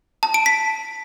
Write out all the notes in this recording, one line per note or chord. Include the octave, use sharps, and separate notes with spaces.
A5
D7
B6